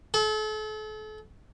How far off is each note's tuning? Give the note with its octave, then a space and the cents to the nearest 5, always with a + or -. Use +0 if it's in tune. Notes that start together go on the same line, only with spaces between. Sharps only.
A4 -40